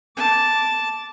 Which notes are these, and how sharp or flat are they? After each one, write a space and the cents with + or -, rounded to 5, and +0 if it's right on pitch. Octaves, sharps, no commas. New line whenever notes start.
A5 +0 D6 -5